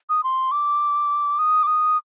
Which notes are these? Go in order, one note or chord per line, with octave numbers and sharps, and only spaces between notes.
D#6
C6
D6
D#6
D6
D#6